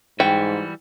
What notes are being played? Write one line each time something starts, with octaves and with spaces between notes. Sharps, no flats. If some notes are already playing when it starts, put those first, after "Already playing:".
G#2 E3 G3 F#4 G5